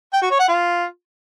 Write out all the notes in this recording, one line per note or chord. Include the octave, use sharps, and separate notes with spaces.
G5
F#4
C#5
F#5
F4